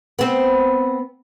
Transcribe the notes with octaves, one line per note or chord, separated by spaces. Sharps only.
B3 C4